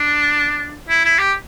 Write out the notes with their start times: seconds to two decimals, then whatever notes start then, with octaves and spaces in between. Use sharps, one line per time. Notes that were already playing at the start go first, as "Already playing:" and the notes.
Already playing: D4
0.89 E4
1.04 E4
1.19 G4